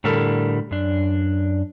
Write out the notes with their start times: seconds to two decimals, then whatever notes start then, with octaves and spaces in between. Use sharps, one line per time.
0.04 A2 D3 G3 A4 A#4
0.71 F#2 D4